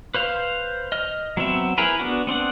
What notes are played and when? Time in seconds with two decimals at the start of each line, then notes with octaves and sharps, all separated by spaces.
0.15 B4 C5 F5
0.92 D#5 F6
1.37 F#3 B3 C4 E5
1.78 E4 G#4 A#4 B4
1.99 B3 D4 F#4
2.27 B3 C4 D4 F#5